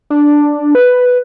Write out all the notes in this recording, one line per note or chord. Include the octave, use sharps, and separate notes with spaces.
D4
B4